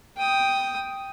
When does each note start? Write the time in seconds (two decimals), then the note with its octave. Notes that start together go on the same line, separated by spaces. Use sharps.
0.17 G5 D#6